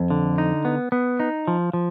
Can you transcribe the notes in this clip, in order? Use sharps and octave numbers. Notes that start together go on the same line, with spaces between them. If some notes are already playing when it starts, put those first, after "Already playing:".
Already playing: F2
D3
D#4
B3
B3
D#4
F3
F3